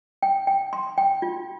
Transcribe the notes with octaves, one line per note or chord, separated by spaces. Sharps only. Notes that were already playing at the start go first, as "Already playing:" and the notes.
G5
G5
C6
G5
F4